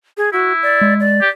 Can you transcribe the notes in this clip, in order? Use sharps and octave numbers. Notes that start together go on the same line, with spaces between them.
G#4
E4 F#4
D5
G#3
D5
G4